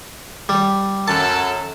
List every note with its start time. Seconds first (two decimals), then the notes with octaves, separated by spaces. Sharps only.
0.49 G3
1.08 F#2 A4 A5